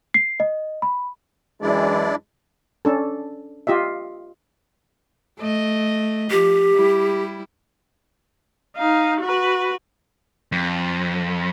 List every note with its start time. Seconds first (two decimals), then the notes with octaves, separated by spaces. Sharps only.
0.14 C7
0.40 D#5
0.82 B5
1.62 F#2 E3 G#3 D4 E4 D5
2.85 C#4 D4 A4
3.67 F4 G4 D#5 E5
5.39 A3 D#5
6.31 F3 G4
6.74 G3 E4
8.76 D#4 F5
9.21 F#4 B4
10.52 F2